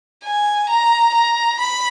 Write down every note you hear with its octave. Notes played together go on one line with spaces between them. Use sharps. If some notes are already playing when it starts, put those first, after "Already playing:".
G#5
A#5
A#5
B5